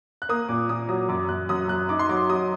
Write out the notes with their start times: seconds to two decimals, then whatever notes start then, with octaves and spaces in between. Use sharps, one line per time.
0.22 F#6
0.29 A#3 D#6
0.49 A#2 D6
0.69 A#2 D#6
0.89 F#3 D#6
1.09 F#2 D6
1.29 F#2 F#6
1.49 F#2 D#6
1.69 F#2 F#6
1.89 D#4 D6
1.99 C6
2.09 F#3 D6
2.30 F#3 D#6